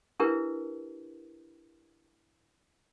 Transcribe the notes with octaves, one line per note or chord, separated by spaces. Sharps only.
D4 E4 G4 A#4 B4